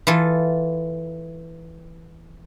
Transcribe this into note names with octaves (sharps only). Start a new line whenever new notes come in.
E3 F4 A4